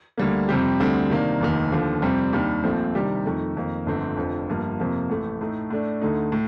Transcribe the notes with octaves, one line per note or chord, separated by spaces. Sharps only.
D2 D3 G3 A#3
F2 C3 G3 C4 G4
D2 D3 G3 C4
C3 D#3 A#3 D4
F1 D#2 D#3
D#2 D3 F3
F2 C3 G3 C4
D#2 D#3 G3 D4
A#1 A#2 F3 A3 C4
C3 D#3 G3 D4 G4
F2 D#3 A3
F2 D#3 A#3
G1 F2 D3 A3 C4
F1 F2 D3 F3
G1 G2 F3 A#3
F2 C3 F3 A#3 F4
A1 A2 A3
A2 A3 D#4
A2 A3 D4
D2 D3 A3 D#4
A2